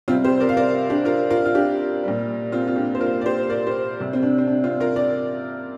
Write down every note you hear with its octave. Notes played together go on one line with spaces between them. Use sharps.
C3 G3 C4 F4
G4 C5
A#4 D5
F5
A#4 D5
D4 G4
F4 A#4
F4 A#4
F4
D4 G4
A#2 G3
C4 F4
F4
D4 G4
C5
F4 A#4
D5
G4 C5
A#4 D5
G4 C5
C3 G3
C4
D4
C4
D4
C4 F4
F4 A#4
A#4 D5